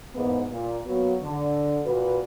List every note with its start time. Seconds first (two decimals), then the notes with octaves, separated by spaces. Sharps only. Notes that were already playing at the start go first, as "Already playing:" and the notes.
0.15 E2 G#2 A#3 B3
0.50 A#2
0.86 F#3 A#3 B3 F#4
1.22 D3
1.86 A#2 F#4 B4